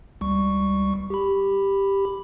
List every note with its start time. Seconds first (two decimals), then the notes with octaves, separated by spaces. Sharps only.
0.21 C#2 G3 C#6
1.10 G4 B5